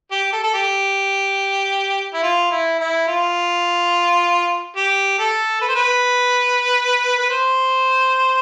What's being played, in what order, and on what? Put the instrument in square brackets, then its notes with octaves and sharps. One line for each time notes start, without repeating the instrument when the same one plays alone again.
[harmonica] G4
A4
A4
G4
E4
F4
E4
E4
F4
G4
A4
B4
C5
B4
B4
C5